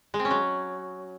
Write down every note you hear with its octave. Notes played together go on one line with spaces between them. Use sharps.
G#3
C4
C#4
F#3